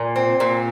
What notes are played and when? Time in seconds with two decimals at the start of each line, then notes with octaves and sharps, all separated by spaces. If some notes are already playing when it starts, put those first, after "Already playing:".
Already playing: A#2
0.16 C4
0.40 A#2